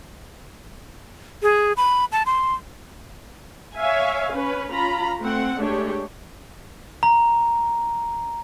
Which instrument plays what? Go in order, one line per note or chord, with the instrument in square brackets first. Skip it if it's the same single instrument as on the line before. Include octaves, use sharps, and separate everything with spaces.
[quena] G#4
B5
A5
C6
[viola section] C#5 E5 F5 G#5
C#4 B4
C#4 F4 A#5 B5
A3 C4 F#5
G#3 A3 D4 G4 C#5
[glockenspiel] A#5